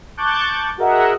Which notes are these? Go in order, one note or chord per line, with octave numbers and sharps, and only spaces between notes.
A5 C#6 D6 F#6 G6 A6
F#4 G#4 A#4 D#5 E5 F#5